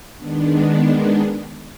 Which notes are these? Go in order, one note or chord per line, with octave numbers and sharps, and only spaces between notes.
D#3 G#3 B3 D4